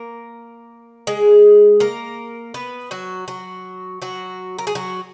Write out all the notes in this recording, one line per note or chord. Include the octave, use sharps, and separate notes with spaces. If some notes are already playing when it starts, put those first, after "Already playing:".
Already playing: A#3 A#4
G#3 G#4
A#3 A#4
B3 B4
F#3 F#4
F#3 F#4
F#3 F#4
A#4
G#4
F#3 F#4